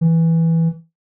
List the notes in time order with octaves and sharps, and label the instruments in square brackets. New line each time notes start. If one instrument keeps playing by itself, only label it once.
[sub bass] E3